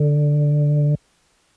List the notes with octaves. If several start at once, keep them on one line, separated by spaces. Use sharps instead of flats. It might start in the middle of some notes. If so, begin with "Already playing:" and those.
Already playing: D3